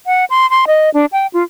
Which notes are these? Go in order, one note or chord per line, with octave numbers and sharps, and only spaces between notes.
F#5
C6
C6
D#5
D4
G5
F4